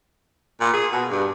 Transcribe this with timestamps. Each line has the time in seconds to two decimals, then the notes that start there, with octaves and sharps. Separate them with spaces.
0.61 A#2
0.74 G#4
0.93 B2
1.11 G2